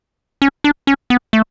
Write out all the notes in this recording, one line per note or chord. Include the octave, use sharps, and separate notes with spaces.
C#4
D4
C#4
B3
A3